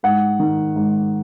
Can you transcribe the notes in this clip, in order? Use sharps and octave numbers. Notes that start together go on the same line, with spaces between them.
G#2 F#5
D#3
G#2